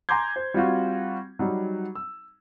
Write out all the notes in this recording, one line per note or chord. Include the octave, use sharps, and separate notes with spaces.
G#5 A#5 C6 D6 G6 G#6
C5
G3 C4 F4 F#4
F#3 G3 D#4
E6